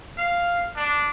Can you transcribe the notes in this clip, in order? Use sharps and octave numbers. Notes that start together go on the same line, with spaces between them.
F5
D4